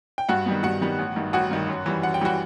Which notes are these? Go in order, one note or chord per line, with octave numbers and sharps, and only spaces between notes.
G5
G2 F#4 F#5
D#3 G3 B3
G2 F#4 F#5
D#3 G3 B3
A1
G2 D#3
A1 F#4 F#5
G2 D#3
F#2
E3 G3
F#2 F#5
G5
E3 G3 F#4 F#5